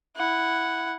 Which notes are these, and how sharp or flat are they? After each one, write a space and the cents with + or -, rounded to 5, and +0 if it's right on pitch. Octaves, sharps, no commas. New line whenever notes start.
E4 +0 F#5 +0